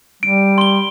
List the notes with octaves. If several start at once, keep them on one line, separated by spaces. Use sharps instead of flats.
G3 D7
C6 G7